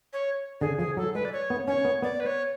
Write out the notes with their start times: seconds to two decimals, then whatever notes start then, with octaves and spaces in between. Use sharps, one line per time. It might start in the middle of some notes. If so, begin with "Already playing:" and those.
0.13 C#5
0.61 D3 G#4
0.79 F3 G#4
0.97 F#3 A4
1.14 G#3 B4
1.25 D5
1.33 C#5
1.50 B3
1.68 C#4 C#5
1.85 B3
2.02 B3 D5
2.20 B4
2.26 C#5